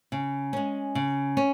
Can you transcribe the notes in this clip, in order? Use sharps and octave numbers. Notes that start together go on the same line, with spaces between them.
C#3
G#3 C#4
C#3
C#4